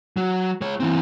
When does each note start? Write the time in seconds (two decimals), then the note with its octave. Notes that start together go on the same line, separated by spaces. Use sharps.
0.17 F#3
0.61 G#3 C#5
0.80 E3 C4